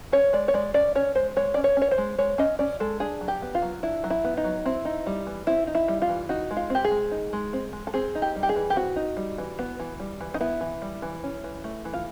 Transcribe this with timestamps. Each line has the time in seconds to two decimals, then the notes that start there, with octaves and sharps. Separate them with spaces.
0.12 C#4 C#5
0.33 G#3 D5
0.48 C#5
0.54 G#3 D5
0.74 C#4 D5
0.95 C#4 C#5
1.15 G#3 C5
1.36 G#3 C#5
1.54 C#4 D5
1.64 C#5
1.77 C#4 C#5
1.91 C5
1.98 G#3
2.18 G#3 C#5
2.38 C#4 D#5
2.59 C#4 D5
2.80 G#3 A4
3.00 D4 G#4
3.21 F#3
3.28 G4
3.42 B3
3.55 F4
3.62 F#3
3.83 D4 E4
4.04 F#3
4.10 E4
4.24 B3
4.37 D#4
4.44 F#3
4.66 C4 E4
4.85 D#4
5.06 G3
5.27 E3
5.47 C4 E4
5.67 D#4
5.75 E4
5.88 G3
6.02 F4
6.09 E3
6.29 D#4 F#4
6.51 G#3
6.57 F4
6.70 C4 G4
6.84 G#4
6.91 G#3
7.11 D#4
7.33 G#3
7.53 C4
7.73 G#3
7.87 A4
7.94 C4 G#4
8.15 D#4
8.22 G4
8.36 G3
8.43 G4
8.49 G#4
8.56 E3
8.70 G4
8.76 C4 F#4
8.96 D#4
9.17 G3
9.38 E3
9.59 B3
9.80 E3
10.00 G3
10.21 E3
10.34 D#4
10.41 B3 E4
10.61 E3
10.82 G3
11.02 E3
11.23 C#4
11.44 E3
11.64 A3
11.85 E3
11.94 F4